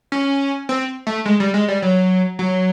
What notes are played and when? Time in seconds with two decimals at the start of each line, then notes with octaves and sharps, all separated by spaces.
0.12 C#4
0.69 C4
1.07 A3
1.25 G#3
1.40 G3
1.54 G#3
1.68 G3
1.82 F#3
2.39 F#3